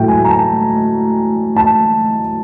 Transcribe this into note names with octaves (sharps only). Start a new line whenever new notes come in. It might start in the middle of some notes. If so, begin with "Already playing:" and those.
Already playing: A2 F#3 A3 G5
G#5
A#5
A5
A5